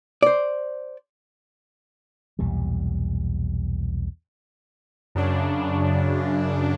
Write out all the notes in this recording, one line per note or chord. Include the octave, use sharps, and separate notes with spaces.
C5 D5
B1 E2 A#2 G3
F#2 C#3 D4